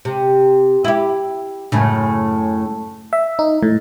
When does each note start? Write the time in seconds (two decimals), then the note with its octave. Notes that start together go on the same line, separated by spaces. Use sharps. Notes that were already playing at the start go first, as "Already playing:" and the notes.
0.05 C3
0.85 E4 G4
1.72 F#2 A2 C#3
3.13 E5
3.39 D#4
3.63 A2